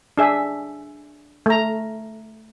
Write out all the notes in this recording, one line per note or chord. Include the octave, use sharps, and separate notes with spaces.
D4 G#4 E5
A3 A#5